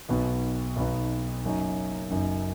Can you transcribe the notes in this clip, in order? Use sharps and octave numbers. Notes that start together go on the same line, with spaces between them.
B1 B2 B3 D#4
B1 B2 B3 D#4
F#1 F#2 F#3 D#4
F#1 F#2 F#3 D#4